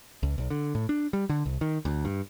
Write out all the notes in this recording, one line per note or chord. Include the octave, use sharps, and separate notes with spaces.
C#2
B1
D3
A2
D4
G3
D3
C2
D#3
D2
G2